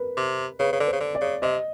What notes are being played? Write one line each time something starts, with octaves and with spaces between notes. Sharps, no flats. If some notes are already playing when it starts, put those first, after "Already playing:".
Already playing: A#4 B4
C3
C#3 B4
C#3
D3
C5
C#3
D3
D5
C#3
C3 D#5